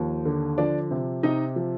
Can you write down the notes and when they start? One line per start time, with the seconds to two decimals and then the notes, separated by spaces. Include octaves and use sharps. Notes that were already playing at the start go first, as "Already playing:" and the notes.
Already playing: D#2 F3
0.25 D3
0.58 F3 D4 D5
0.91 C3
1.23 C3 D#4 D#5
1.56 F3